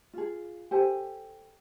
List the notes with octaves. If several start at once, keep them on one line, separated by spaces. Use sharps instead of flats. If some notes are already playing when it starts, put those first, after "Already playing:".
F4 G#4
G4 A4 C5 G#5